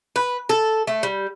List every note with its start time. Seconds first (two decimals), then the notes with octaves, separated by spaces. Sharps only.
0.16 B4
0.49 A4
0.87 A3
1.03 G3